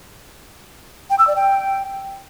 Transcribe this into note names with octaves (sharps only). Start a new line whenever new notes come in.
G5
E6
D5
G5